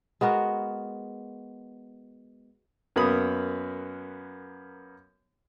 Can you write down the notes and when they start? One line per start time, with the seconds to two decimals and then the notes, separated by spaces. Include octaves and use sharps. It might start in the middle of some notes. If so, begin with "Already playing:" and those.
0.21 G#3 B3 F#4 A#4
2.96 F#2 A#3 B3 B5 D#6